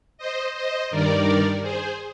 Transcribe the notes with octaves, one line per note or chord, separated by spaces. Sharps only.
C5 D#5
C5 D#5
G2 D#3 G3 A#4 D5
G#4 C5